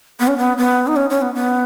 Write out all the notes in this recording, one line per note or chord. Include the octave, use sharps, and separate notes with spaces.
B3
C#4
B3
B3
D#4
C#4
C#4
B3
B3